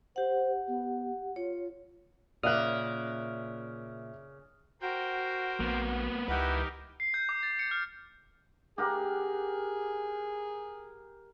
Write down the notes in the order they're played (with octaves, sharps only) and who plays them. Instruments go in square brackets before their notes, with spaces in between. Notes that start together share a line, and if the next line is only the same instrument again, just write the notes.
[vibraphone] G4 F#5 [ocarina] C5
[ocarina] B3
[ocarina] F4 [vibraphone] C#5
[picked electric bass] A#2 [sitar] C#3 A#3 [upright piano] D5 E5 F#6 [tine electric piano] D#6 F6
[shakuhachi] F#4 [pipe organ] A#4 C5 G5
[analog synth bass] A#1 [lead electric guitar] A#3 B3
[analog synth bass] C#2 [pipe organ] D#4 G4 A#4 [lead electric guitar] E4 B4 [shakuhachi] F#5
[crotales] C7
G6
D6
A6
C#7
F6
[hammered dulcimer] G4 A#4 F#5 [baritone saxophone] G#4